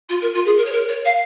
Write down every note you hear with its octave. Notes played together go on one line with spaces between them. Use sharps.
F4
A#4
F4
G#4
A#4
C#5
A#4
C#5
F5